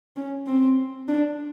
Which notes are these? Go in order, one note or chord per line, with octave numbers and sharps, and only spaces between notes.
C#4
C4
D4